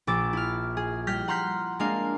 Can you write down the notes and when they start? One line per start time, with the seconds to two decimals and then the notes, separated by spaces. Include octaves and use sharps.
0.07 A#1 D6 E6 A6 D7
0.33 E4 F6
0.77 G#4
1.07 G3 F6 G6 A#6 B6
1.28 F#5 A#5 C6 F6 G6 B6
1.79 G#3 A#3 D4 A#4 F5